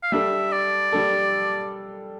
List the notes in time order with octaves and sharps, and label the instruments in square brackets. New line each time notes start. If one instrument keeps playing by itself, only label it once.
[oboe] F5
[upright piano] G3 D4 A4 [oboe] E5
[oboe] D5
[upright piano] G3 D4 A4